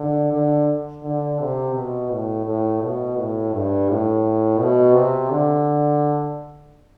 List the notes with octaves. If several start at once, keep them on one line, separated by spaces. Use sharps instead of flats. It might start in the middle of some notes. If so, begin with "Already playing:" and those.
Already playing: D3
D3
D3
C3
B2
A2
A2
B2
A2
G2
A2
B2
C3
D3